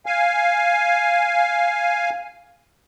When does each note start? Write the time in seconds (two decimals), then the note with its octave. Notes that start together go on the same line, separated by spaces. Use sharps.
0.06 F5 G#5